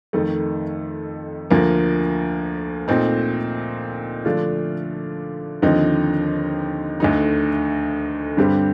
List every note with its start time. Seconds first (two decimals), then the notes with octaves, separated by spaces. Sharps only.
0.13 F2 D#3 A3
1.50 D2 D3 F3 A#3
2.88 A#2 A3 C4 D#4
4.25 D3 F3 A3 D4 F4
5.62 D#2 D3 F3 C4 D#4
7.00 D2 D3 A3 D#4
8.37 G2 D3 G3 C4 G4